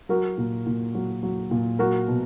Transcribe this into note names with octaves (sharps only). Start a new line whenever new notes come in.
F#3 F#4 A#4
A#2
A#2
F#3
F#3
A#2
F#3 F#4 A#4
B2